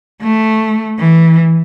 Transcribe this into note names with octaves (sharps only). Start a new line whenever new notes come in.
A3
E3